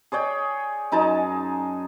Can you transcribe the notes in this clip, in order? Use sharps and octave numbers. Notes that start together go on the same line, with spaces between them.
G#4 C#5 D5 G5
F#2 D#4 G#4 A5